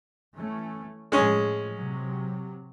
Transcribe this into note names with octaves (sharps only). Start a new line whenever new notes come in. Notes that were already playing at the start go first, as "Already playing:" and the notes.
E3 A3 C#4
A2 F3 G#3 C#4 G#4
C3 F#3